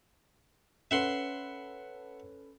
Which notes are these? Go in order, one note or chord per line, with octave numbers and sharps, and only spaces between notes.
C#4 A4 B4 E5 F#5 C6